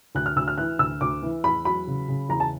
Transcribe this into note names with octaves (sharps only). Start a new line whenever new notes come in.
D2 F#6
F6
D2 E6
F6
E3 F#6
D2 E6
D2 D6
E3
E2 B5
F#3 B5
C#3
C#3
E2 A#5
A5